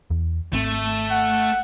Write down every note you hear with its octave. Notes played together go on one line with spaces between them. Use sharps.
E2
G#1 A3 C4
F#5